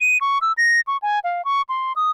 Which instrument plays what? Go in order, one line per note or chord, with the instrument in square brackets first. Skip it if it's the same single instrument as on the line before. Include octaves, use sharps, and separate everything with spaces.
[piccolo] D#7
C#6
E6
A#6
C#6
G#5
F5
C#6
C6
D#6